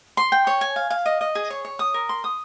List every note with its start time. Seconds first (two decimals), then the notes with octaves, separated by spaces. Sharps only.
0.17 C6
0.32 G5
0.47 C#5
0.61 G#5
0.76 F5
0.90 F5
1.06 D#5
1.21 D#5
1.35 G#4
1.50 C#5
1.65 C#5
1.79 D#6
1.94 A#4
2.09 C6
2.24 D#6